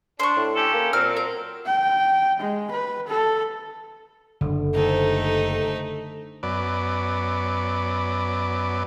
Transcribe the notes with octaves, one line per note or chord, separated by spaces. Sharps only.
D4 C5 C#6
A2
C#4 G4 A4
A#3
A#2 F#3 C4 F6
A#4
G5
G#3
B4
A4
F#1 D3
C3 D#3 A3 D#4
F#2 B3 D5